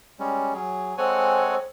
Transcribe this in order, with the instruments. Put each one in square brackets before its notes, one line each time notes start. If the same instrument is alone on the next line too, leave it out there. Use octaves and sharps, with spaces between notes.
[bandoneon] G3 G#3 C#4
[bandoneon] F#3 [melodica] G#4
[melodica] G#3 C4 A4 [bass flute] C5 [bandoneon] C#5 F#5 G#5